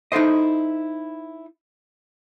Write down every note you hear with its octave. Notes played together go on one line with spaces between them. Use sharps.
D#4 E4 A4 C5 D#5